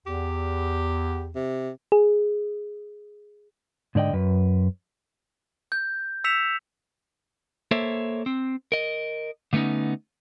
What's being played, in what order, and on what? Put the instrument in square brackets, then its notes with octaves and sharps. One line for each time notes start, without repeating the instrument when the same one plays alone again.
[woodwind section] E2 [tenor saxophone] G4
[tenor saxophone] C3
[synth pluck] G#4
[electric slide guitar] G#2 D3 D5 D#5 G5
F#2 B4
[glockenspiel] G6
E6 G6 B6 C#7 E7 F7
[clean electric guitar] A#3 A4 C5 C#5 E5
C4
A#4 D#5
D3 A3 B3 C#4 D#4